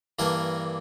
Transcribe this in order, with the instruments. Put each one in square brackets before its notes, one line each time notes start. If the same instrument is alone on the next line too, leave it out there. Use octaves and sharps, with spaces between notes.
[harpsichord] G2 E3 A#3 D4 A#4